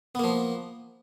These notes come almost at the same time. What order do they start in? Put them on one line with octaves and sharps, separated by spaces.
B3 A#3 F3